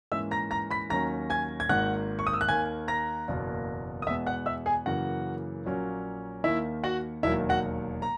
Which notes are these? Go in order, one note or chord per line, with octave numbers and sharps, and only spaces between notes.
G#2 E3 A#3 C#4 E5 E6
A#5 A#6
A#5 A#6
B5 B6
D#2 D#3 F#3 C#4 A#5 A#6
G#5 G#6
G#6
G#1 G#2 D#3 A#3 F#5 F#6
C#6
D#6
E6
F#6
D#2 D#3 A#3 G#5 G#6
A#5 A#6
F#1 E2 B2 A#3
D#6
E2 B2 G#3 B3 E5 E6
F#5 F#6
E5 E6
G#4 G#5
F#2 C#3 E3 A#3 F#4 F#5
A#1 A#2 F#3 A#3 C#4
D#2 D#3 A#3 E4 E5
F#4 F#5
E1 D#2 D#3 F#3 E4 E5
F#4 F#5
A#5